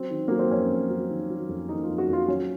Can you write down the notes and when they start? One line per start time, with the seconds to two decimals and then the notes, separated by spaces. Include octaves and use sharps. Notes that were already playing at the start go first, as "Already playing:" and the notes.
Already playing: F#3 C4
0.11 D#3
0.28 F#3 A#3
0.39 C4
0.50 F2 C#4
0.70 F2
0.90 F#3
1.10 D#3
1.30 F#3
1.49 F2
1.69 D#3 D#4
1.83 F4
1.88 F2
1.98 F#4
2.08 F2 F4
2.28 F#3 C#4